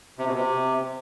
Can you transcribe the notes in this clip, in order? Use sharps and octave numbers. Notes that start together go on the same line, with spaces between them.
C3
B2
C3